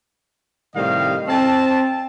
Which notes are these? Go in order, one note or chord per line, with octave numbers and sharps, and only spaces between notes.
A2 C3 D#3 G3 D#5 F5
C4 A5